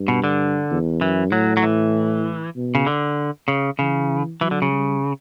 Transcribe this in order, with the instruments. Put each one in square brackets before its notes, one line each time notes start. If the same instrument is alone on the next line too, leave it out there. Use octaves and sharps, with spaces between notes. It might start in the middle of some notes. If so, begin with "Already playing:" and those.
Already playing: [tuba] G2
[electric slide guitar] B2
D3
[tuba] E2
[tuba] F#2 [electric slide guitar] E3
[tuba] A2 [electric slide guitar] F#3
[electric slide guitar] F#3
E3
[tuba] B2
[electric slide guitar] C#3
D3
C#3
[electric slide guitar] C#3 [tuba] E3
[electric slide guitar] E3 [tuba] F#3
[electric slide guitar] D3
C#3
[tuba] G3